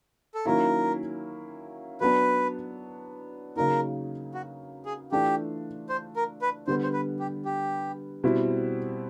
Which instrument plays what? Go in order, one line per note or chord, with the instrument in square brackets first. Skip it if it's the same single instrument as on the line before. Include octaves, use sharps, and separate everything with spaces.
[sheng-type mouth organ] A4
[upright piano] D#3 F#3 A#3 C#4 E4 [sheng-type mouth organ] A#4
[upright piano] F#3 B3 D4 [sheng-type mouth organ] B4
[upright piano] C#3 F#3 A#3 D#4 [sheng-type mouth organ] A#4
[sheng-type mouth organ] F#4
G#4
[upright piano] E3 A3 D4 F4 [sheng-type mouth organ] G4
[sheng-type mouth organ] C5
A#4
B4
[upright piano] D3 G3 B3 [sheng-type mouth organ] C5
[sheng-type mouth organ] C5
B4
G4
G4
[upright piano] B2 G3 C4 E4